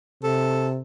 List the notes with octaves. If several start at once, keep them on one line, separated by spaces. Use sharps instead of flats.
C3 A4